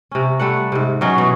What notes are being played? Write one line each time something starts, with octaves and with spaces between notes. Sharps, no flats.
C3 C#4
C3 G3 A3 F#5
G#2 C3
B2 F#3 C#4
B2 E3